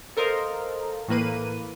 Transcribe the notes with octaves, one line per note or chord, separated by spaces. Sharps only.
A4 A#4 C5 D#5 F5
A2 E3 A#3 B4 D#7